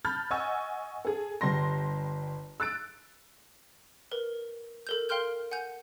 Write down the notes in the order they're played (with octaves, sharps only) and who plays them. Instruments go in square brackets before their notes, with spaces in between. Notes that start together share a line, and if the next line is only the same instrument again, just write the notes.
[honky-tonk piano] A5 B5 F6 G6 A6
D#5 F#5 G#5 C#6 E6
G#4 A4
G1 G3 C6 A#6
E6 F#6 A6 D7
[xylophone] A#4 B4
A4 A#4 G6
A#4 F5 G5 C6 F6 G6
F#5 G#5 G6